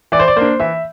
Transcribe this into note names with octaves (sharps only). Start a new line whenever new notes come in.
E3 D5
C5
D5
A#3 D4 C5
E3 E5